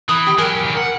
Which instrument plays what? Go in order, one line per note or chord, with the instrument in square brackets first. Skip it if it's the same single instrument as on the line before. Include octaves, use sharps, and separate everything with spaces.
[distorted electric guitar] E3 [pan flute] B5 [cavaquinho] D#6
[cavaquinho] G4
[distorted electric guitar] F#3 G4 [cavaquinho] G#4 [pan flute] A#4
[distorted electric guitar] D#3 E3
F#5